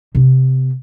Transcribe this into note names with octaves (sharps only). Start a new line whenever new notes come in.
C3 B3